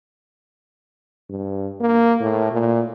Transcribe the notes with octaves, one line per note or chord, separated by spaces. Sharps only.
G2
A#3
A2
A#2